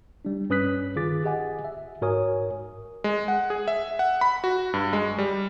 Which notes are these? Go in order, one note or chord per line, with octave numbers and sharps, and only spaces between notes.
G3 D4
G2 C#4 B4 D#6 F#6 B6
D#3 F4 G#4 D6 A6
G4 G#4 D#5 F#5 G#5
E5
G#2 F#4 A#4 C#5 G#5 D#6
G#3
F#5
G#4
E5
F#5
B5
F#4
G2
G#3
G3